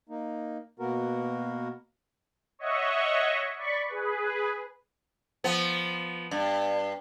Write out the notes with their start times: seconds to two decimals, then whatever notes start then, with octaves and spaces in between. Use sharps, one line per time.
0.09 A#3 D#4
0.79 B2 A#3 B3 F#4 A#4
2.59 C#5 D#5 E5 F#5 C#6
3.57 D5 B5 C#6
3.88 G#4 B4
5.44 F3 B3
6.31 G2